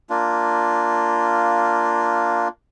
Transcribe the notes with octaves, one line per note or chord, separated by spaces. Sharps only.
A#3 D4 F4